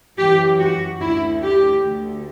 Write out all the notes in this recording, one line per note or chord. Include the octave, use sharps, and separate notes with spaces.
F#2 E3 G4
F#4
D2 D3 E4
G4
D2 D3